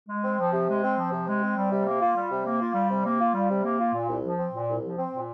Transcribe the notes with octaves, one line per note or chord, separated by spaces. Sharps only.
G#3
C4
F3
C3
G#3
C4
F3
C3
G#3
C4
G3
C3
A#3
F4
G3
C3
A#3
F4
G3
C3
A#3
F4
G3
C3
A#3
F4
A#2
C2
F3
C4
A#2
C2
F3
C4
A#2